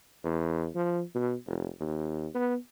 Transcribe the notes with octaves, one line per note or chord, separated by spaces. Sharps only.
E2
F3
B2
F1
D#2
B3